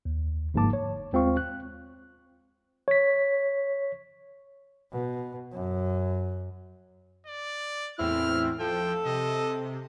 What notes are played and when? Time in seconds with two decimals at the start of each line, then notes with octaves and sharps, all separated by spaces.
0.05 D#2
0.54 G1 G#2 F3 A#3 A5 D6
0.73 C#5
1.12 D#2 G#3 C4 F4 F5 C#6
1.37 F#6
2.88 C#5 B6
4.92 B2
5.53 F#2
7.27 D5
7.99 E2 A2 C4 E4 F6
8.60 F3 A4 G5
9.05 C3 D#5